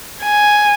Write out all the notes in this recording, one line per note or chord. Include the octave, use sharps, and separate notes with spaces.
G#5